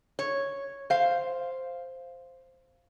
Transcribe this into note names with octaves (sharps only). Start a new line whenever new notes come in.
C#5
C5 F5